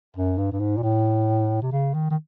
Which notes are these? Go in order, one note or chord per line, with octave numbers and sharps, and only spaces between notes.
F#2
G2
G2
G#2
A#2
A2
C3
C#3
D#3
D#3